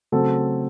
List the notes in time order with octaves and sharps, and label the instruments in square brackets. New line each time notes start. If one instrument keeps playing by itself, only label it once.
[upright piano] C#3 F#3 A3 C4 A4